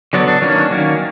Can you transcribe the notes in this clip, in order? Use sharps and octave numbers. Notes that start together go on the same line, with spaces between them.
D3 F#3 B3 D4
D4
D#3 F#3 A#3 C#4 D4
D#3 F#3 A#3 C#4